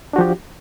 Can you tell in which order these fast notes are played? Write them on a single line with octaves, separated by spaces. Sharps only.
D4 F#4 F3 G4